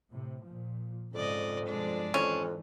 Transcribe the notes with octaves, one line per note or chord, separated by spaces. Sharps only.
A2 C3
A#2 F3
F2 G#2 C#3 D5 D#5
G2 B2 F3 G#3 D4 D5
F2 G#2 D#3 E3 C#4